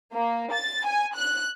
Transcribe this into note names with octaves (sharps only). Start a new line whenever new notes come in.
A#3
A6
G#5
F#6